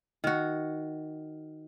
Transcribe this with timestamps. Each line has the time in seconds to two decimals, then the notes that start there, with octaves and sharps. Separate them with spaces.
0.24 D#3 F#4